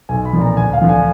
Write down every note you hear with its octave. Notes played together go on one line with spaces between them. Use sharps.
B1 G#5
B5
A#2 F3
A#5
D2 G#5
F5
D3 F3
G#5